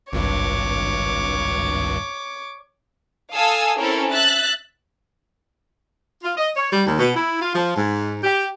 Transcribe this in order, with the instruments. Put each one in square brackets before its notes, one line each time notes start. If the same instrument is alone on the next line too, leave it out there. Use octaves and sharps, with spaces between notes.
[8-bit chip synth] G#1 C#2 G2 [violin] C#5 D6
[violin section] A4 F5 G#5 D#6 E6
C4 C#4 E4 A4 A#4
E5 F#6 A6
[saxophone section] F4
D#5
C#5
G3
D#2
B2
E4
F4
F3
G#2
G4